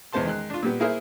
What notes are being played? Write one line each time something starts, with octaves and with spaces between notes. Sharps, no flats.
E2 G#3 B3 C5 A5 C6
D#3 G#3 F#6
D4 F4
A#2 G3 B3
A#3 E4 G#4 A#4 C5